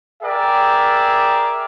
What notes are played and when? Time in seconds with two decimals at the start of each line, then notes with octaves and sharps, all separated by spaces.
0.23 G#4 A#4 D5 E5 G5